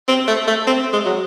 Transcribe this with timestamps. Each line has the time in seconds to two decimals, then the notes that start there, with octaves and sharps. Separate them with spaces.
0.08 C4
0.27 A3
0.47 A3
0.67 C4
0.93 G#3
1.05 F#3